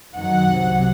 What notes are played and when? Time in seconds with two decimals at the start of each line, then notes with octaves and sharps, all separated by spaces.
0.16 F#2 D#3 F#3 F#5
0.50 C2 C3 F#3